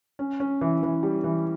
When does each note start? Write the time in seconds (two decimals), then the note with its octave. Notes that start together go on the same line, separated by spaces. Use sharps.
0.19 C#4
0.40 C#4
0.61 E3
0.83 E3
1.03 G3
1.24 E3